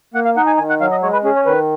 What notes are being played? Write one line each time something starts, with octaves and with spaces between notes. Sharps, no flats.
A#3 F#5
F5
D#4 F#5
G#5
D#3 G#5
F#5
F#3 F5
D#5
G#3 C#5
B4
C#4 G#4
C#5
D#3 B4